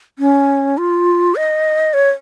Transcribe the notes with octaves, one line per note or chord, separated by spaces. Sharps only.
C#4
F4
D#5
C#5